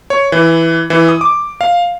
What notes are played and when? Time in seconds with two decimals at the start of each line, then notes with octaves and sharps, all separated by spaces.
0.10 C#5
0.32 E3
0.90 E3
1.08 D#6
1.21 D6
1.61 F5